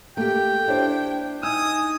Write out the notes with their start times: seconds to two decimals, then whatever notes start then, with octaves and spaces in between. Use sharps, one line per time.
0.17 A3 A#3 G4 G5
0.68 D4 E4 G4 C5
1.43 D#4 G#5 D#6 E6